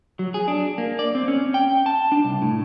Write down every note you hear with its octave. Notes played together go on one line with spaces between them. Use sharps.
F#3
G#4
D4
A#3
D5
C4
C#4
G5
A5
D4
C2
A2